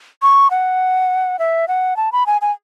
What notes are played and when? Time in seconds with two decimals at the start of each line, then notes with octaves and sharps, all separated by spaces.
0.22 C#6
0.51 F#5
1.39 E5
1.68 F#5
1.97 A5
2.12 B5
2.27 G#5
2.42 G#5